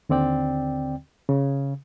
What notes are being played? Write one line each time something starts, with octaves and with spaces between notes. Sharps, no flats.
D#2 D3 C4 D5 G5
C#3